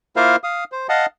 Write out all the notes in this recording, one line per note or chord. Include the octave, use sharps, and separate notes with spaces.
A#3 E4 F4 A#4 C5 F5
F5 D#6
C5
D#5 F5 F#5 A5 D#6